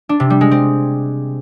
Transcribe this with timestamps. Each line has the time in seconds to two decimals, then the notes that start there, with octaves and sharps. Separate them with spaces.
0.09 D4
0.20 C3
0.30 G3
0.41 G#3
0.51 C4